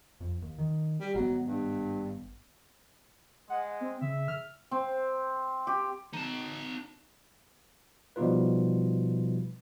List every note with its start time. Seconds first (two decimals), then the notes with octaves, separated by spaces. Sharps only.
0.20 F2
0.42 D#2
0.58 D#3
1.00 G3
1.15 G#1 F#3 G#3 B3
1.46 G2
3.50 G#3 F#5
3.81 C4
4.01 C#3 E5
4.28 F6
4.71 C4
5.67 G4
6.13 D#4 A5
8.16 B2 F3 G3 D#4 F4 B4